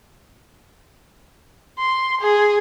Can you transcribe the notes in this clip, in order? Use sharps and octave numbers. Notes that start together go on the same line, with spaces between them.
C6
G#4